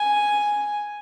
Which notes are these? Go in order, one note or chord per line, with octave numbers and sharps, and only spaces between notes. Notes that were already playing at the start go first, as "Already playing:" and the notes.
Already playing: G#5